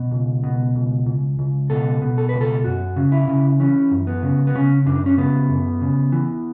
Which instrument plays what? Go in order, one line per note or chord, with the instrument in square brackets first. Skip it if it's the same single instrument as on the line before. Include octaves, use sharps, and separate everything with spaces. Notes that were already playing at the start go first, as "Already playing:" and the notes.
Already playing: [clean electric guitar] B2
C#2
B2
C#2
C#2
C#2
B2 A4
B2
A4
C#2 B4
A4
F#2 F#4
C#3
E4
C#3
E3 C#4
F#2
B3
C#3
B3
C#3 C#4
F#2 D4
C#4
C#3 B3
F#2
C#3
E3